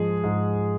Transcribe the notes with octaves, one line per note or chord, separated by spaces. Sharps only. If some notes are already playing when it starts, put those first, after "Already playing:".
Already playing: G#2 F3 G#3 G#4
G#2